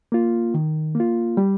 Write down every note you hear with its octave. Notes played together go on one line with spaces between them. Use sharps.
A#3 F4
D#3
A#3 F4
G3